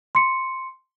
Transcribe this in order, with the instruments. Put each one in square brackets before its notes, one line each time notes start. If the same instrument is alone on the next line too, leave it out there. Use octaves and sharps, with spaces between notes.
[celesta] C6 C#7